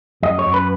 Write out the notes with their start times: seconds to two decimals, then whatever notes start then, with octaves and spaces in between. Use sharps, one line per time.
0.23 F#2 D#5
0.39 C#5
0.46 F#2
0.54 B4